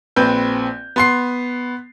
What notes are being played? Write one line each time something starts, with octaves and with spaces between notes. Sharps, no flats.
A#1 C4 B4 G6
B3 C6 C7